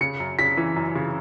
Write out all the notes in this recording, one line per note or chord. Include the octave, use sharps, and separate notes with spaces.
C#3 C#7
F#2
C#3 B6
E3
F#2
C#3